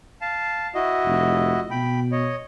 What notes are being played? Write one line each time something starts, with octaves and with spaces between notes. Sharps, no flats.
F5 A5
E4 F#4 D#5
F1
B2 G5 B5
C#5 D#5